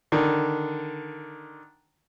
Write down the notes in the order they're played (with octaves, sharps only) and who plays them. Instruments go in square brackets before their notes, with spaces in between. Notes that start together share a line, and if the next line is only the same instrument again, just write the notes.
[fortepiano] D3 D#3